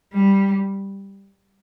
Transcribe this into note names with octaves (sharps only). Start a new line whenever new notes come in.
G3